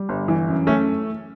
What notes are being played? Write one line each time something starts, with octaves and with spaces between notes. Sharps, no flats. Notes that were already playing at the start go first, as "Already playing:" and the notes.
Already playing: G3
G1
E3
F#2
A3 C#4